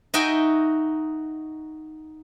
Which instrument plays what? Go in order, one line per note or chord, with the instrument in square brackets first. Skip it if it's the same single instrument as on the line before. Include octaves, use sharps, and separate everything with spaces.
[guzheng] D#4 F#4 D#5 E5 G5 G#5